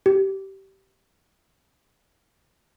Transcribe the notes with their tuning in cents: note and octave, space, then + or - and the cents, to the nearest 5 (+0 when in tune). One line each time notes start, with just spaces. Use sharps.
G4 -20